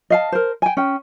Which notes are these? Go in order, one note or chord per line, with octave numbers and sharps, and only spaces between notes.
D#5 F5 A5
A#4 C5
G5 G#5
C#4 G5